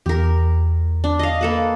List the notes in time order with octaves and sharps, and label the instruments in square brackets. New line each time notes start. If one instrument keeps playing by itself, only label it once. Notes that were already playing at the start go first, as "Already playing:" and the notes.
[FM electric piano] E2 [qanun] G4 A#4
[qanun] D4
D#5 F5
A#3 A4 B4